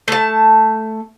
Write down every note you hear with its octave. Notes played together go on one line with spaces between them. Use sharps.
A3 A5